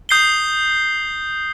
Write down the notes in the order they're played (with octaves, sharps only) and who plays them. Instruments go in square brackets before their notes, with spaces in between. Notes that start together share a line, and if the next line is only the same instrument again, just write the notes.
[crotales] D#6 G6 C7 G7